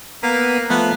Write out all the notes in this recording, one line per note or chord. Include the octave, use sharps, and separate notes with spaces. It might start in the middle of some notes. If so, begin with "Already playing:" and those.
A#3 B3 B4
F3 A3 B3